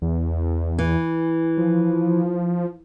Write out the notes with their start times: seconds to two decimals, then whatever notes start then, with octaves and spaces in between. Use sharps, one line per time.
0.02 E2
0.79 E3
1.58 F3